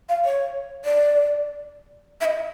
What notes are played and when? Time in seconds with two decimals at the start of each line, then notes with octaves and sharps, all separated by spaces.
0.09 F5
0.25 C#5
0.85 D5
2.21 E5
2.25 D#5